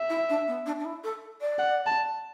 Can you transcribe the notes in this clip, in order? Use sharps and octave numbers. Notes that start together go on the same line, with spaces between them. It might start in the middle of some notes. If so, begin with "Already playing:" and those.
Already playing: E5
E4
D4
B3
D4
D4
E4
A4
D5
F#5
A5